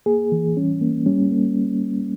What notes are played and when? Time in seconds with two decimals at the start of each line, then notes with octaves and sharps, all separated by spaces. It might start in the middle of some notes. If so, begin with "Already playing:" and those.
0.06 A#3 G#4
0.32 E3
0.56 G3 C#4
0.81 A#3
1.06 G3 C#4
1.31 A#3